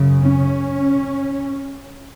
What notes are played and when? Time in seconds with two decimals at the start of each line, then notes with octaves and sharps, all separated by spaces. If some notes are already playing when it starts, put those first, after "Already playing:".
Already playing: F#2 C#3
0.23 C#4